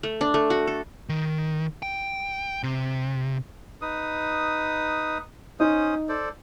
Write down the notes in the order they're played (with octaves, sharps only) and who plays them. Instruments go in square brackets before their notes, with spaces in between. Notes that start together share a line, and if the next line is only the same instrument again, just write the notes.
[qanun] A3
D4
A3
F#4
A4
[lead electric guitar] D#3
G5
C3
[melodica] D#4 B4 D#6
[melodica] C#4 C5 D#6 [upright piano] D#4
[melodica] A4 C5 D5